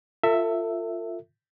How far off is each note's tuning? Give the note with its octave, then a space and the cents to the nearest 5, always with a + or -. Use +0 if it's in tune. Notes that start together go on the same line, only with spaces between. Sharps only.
F4 +0 A4 +40 E5 +0